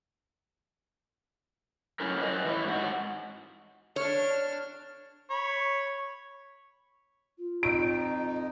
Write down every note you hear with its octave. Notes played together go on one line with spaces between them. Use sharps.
F#3 A3 C#4 E4 A#4
B4 D#5 E5
E3 E4 C#5
G#2 F#4
D4 C#5 F6
C#5 B5
F4
F2 D#4 D7